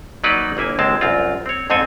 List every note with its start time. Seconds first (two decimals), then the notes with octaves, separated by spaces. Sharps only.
0.24 F#3 A#3 B3 D#4 B4 D5
0.57 G1 A#3 E4 G#5
0.79 C#2 G#3 C4 A5
1.01 C2 F#2 C4 F4
1.46 C4 C#5
1.70 F2 G#2 C4 A4 G#5